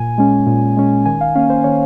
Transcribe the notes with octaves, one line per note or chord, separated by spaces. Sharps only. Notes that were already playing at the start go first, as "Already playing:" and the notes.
Already playing: A#2 G#5
G#3 C#4
A#2
G#3 C#4
D#3 G#5
F5
A#3 C#4 F5
C5
D#3 C#5